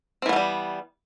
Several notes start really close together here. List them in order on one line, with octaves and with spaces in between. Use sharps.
C4 E3 B3 A3 G3